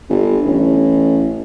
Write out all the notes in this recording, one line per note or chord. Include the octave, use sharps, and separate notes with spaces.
G1
A1